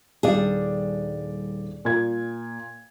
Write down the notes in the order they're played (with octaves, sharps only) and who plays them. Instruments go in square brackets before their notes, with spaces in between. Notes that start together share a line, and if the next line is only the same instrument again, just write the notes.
[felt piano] D#1 D5 [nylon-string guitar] G3 D4 G#4
[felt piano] A#2 G#6